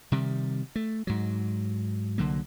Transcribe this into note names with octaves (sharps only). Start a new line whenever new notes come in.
C3 D#3 G3
A3
G#2 F#3
C2 D3 F#3 A#3